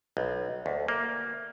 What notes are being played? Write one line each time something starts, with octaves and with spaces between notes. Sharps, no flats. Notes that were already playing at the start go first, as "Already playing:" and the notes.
B1
D2
A#3